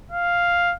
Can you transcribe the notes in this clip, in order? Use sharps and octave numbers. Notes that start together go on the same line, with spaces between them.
F5